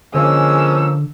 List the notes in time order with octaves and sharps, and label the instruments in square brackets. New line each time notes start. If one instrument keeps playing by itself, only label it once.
[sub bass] D3 [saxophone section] F3 A#3 C#4 [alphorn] G#3 [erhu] E6